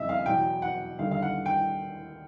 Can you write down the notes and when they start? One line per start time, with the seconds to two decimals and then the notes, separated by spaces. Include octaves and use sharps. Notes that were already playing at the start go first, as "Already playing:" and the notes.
Already playing: F2 C#3 G3 D#5 E5
0.09 F5
0.26 E2 B2 F#3 G5
0.62 F#5
0.99 D#2 D3 G3 F5
1.11 F5
1.22 F#5
1.46 G5